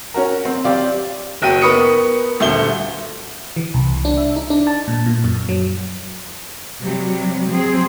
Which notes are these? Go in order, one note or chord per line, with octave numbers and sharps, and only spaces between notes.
C#4 F#4 A#4
C4
C4 G4 D5 F5
F#1 F#4 G5 D#7
B3 A#4 B5 C#6 D#6 C#7
D#1 D2 A3 G7
E3
C2
D4
E5
D#4
D4
A5
A#2
A#2
F#2
F#3
C3 F#3 G3
F#3 C4 G#4